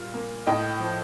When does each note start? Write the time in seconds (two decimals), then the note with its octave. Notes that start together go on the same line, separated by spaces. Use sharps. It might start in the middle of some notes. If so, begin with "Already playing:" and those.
Already playing: A#2 G3 F4
0.14 A#3
0.47 A2 D#5 G5
0.80 F3